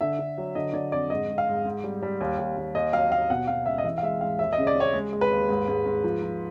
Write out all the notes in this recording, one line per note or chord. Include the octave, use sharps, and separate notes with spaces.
D3 E5
D3
F#3
D3 D#5
D3 D5
F2 D5
G#2 D#5
G#2
F5
G#2
G#2
G3
G3
D#2
D#2
D#2
D#2 D#5
F#3 F5
D#2 F5
B2 F#5
B2 F5
C#2 E5
D#5
E3 E5
F5
G#3 E5
G#2 F5
D#2 E5
D#5
C#3
D5
C#3
C#5
G#3
G#3
B4
D#2
G#2
G#2
G#2
F3
F3